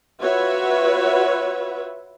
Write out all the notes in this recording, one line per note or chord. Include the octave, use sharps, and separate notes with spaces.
F4 F#4 B4 C#5 E5